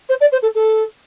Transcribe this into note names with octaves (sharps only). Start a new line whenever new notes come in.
C5
D5
C5
A4
A4